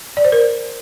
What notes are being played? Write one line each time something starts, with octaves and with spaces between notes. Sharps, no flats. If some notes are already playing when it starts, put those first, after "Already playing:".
D5
C5
A#4